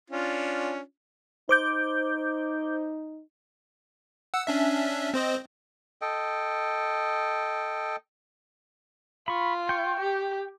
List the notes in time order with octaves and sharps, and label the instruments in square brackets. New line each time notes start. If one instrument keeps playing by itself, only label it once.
[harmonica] C#4 D4 F4
[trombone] D#4 [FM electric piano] C5 D6 G6
[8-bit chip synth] F#5 E6
C#4 D4 E5
C4 C5 D#5
[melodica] A4 D#5 G5
[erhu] F4 [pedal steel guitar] B5 C#6
[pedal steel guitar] G5 C#6
[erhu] G4